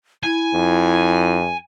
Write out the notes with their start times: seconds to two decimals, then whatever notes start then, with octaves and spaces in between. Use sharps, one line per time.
0.24 E4 G#5
0.54 F2